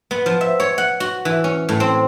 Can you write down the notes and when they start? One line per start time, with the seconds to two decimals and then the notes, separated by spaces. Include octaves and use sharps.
0.11 B3
0.26 F3
0.41 E5
0.60 C#5
0.78 F#5
1.00 F#4
1.25 E3
1.44 C#4
1.69 A2
1.80 C4